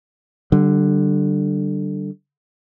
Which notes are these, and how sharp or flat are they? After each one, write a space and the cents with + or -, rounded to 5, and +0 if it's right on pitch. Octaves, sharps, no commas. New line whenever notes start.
D3 +5 G3 -25